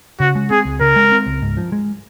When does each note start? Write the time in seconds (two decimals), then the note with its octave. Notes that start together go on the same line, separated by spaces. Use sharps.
0.20 C#3 F#4
0.35 G#3
0.51 C4 G#4
0.65 C#2
0.81 C#3 A#4
0.96 G#3
1.12 C4
1.26 C#2
1.42 G#2
1.57 F3
1.72 G#3